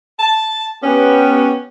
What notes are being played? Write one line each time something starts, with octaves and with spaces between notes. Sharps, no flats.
A5
B3 C#4 G4